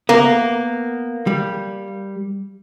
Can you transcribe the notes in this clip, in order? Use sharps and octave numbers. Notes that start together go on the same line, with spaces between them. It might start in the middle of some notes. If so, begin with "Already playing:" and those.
A#3 B3
G3